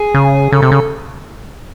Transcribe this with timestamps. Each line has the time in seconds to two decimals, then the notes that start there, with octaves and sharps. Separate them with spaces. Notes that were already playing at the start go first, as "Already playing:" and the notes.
Already playing: G#4
0.14 C#3
0.52 C#3 A4
0.62 C3
0.72 C#3